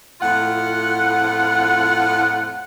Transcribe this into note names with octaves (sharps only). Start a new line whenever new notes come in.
F2 A2 F4 F#5